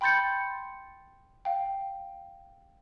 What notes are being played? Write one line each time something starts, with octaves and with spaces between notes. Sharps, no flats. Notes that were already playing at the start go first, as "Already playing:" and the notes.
G5 B5 C6 G6 A6 C#7
F5 G5